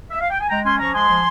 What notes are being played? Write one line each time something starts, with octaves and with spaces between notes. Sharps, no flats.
E5
F5
G5
G#5
G#3 G5 A#5
C#4 G#5 C6
F3 A#5 C#6
G#3 G#5 C6
F3